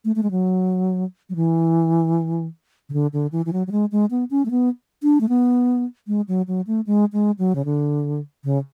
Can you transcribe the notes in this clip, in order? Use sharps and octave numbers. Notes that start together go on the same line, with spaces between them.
A3
A3
G#3
F#3
F#3
E3
C#3
D3
D3
E3
E3
F#3
F#3
G#3
G#3
B3
C#4
A3
B3
D4
A3
B3
G#3
F#3
F#3
A3
G#3
G#3
F#3
C#3
D3
C#3